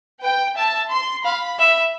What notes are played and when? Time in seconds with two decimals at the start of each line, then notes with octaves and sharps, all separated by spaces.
0.21 B4 G5
0.56 E5 A5
0.90 C6
1.25 F5 B5
1.59 E5